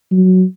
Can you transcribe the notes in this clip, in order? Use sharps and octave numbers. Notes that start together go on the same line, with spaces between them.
F#3